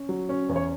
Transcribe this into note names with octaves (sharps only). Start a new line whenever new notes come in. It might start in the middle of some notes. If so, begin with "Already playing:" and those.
Already playing: C#4
F#3
C#4
E2
C#5